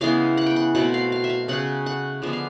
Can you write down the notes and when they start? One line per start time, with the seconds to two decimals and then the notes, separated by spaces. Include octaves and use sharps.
0.01 C#3 E3 G#3 B3 F5
0.37 F#5
0.46 G5
0.56 F#5
0.75 B2 F#3 A3 C4 F#5
0.94 F5
1.12 F5
1.24 E5
1.30 F5
1.48 C#3 F#3 A3 C#4 F#5
1.86 F#5
2.22 D3 F3 G#3 B3 E5
2.33 F5